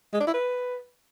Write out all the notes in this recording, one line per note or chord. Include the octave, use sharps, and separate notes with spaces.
G#3
D4
E4
B4